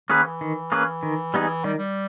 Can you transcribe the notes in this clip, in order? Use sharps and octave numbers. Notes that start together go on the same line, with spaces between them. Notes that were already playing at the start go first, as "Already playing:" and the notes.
D#3 A#3 C#4 G#4 B4
E3
D#3
A#3 C#4 G#4 B4
D#3
G3 B3 D#4 G#4
D#3 G3
G3